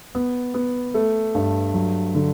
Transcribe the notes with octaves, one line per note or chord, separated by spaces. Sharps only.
B3
B3
A3
G2
F#3
D3